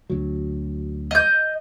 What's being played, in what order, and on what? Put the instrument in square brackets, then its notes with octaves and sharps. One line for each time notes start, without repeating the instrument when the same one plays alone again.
[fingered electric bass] D2 F#3
[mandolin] D#5 G6